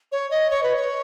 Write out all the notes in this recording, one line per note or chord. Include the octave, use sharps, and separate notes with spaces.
C#5
D#5
C#5
B4
C#5